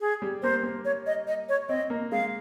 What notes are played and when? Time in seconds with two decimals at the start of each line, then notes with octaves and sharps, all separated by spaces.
0.01 G#4
0.22 G3
0.42 A#3 C5
0.63 A#3
0.85 C#5
1.07 D#5
1.27 D#5
1.49 C#5
1.69 C4 D#5
1.90 A#3
2.12 G#3 F5